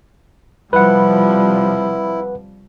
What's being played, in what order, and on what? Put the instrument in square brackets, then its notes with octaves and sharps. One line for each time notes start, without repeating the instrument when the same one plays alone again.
[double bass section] C3 F3 G3 [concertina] E4 [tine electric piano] B4 F#5